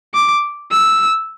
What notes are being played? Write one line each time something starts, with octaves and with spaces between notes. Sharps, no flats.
D6
E6